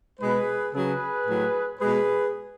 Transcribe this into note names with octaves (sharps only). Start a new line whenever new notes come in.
B2 G#3 G#4 B4
C#3 F#3 G#4 B4
A2 F#3
B2 G#3 G#4 B4